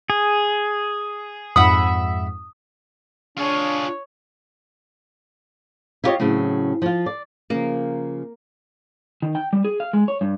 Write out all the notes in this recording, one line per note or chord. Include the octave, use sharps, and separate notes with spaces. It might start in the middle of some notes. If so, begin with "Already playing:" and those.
G#4
F2 G#2 E5 F#5 B5 D#6
D4 F4 G#4 C#5
E4 F4 G4 B4 C#5 D#5
A2 C#3 F#3 C4 C#4
F3 F4
D5
C#3 F3 A#3
D#3
G5
G3
G#4
F5
G#3
C#5
G2